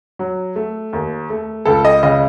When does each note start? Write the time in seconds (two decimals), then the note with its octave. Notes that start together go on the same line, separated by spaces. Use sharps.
0.19 F#3
0.56 A3
0.93 D#2
1.30 A3
1.65 C#2 A4
1.85 D#5
2.03 C#3 D#5